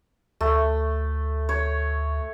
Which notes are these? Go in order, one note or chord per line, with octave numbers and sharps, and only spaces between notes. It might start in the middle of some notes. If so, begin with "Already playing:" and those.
D2 A3
C#5